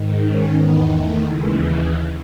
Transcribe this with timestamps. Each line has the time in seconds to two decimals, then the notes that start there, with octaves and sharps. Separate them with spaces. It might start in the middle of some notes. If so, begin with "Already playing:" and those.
Already playing: G#2 D#3
0.24 C#4
0.58 E2 D#3 B3
0.92 A3
1.27 D#2 C#3 E3 G#3